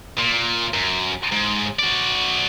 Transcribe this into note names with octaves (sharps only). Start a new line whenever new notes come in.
A#2
F#2
G#2
F#4 D5